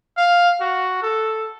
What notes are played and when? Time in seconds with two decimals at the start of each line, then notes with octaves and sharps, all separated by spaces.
0.17 F5
0.61 F#4
1.02 A4